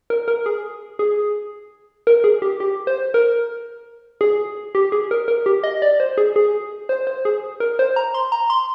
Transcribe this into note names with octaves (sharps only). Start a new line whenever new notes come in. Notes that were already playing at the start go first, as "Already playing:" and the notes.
A#4
A#4
G#4
G#4
A#4
G#4
G4
G4
C5
A#4
G#4
G4
G#4
A#4
A#4
G4
D#5
D5
C5
G#4
G#4
C5
C5
G#4
A#4
C5
A#5
C6
A#5
C6